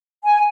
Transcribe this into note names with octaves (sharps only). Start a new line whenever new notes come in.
G#5